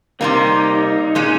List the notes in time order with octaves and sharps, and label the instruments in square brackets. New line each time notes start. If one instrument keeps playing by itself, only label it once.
[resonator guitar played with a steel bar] C3 G3 A#3 [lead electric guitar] D#4
[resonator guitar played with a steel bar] A#2 G#3 C#4